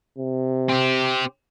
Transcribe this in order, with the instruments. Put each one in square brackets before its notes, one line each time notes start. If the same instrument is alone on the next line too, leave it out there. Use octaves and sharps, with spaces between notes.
[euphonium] C3
[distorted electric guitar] C4 G4